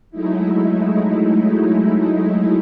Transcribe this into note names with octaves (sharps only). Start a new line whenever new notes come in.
F#3 G#3 A3 D#4 E4